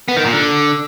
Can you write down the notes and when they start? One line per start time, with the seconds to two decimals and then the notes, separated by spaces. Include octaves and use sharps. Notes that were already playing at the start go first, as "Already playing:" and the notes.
0.08 B3
0.17 D#3
0.25 A#2
0.33 D3